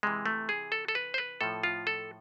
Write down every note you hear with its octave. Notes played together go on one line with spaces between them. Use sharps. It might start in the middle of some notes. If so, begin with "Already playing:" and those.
C3 E3 G#3
A3
G#4
A4
A4
B4
C5
B4
A2 F3 A4
F4
A4